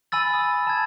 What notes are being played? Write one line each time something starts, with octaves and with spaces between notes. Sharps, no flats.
G#5 B5 E6 A6
D#6
A5 G#6